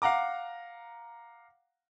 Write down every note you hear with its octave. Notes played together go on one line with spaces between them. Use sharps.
F5 F#5 A#5 D6